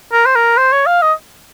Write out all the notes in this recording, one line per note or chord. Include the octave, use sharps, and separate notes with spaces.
A#4
C5
A#4
C5
C#5
F5
D#5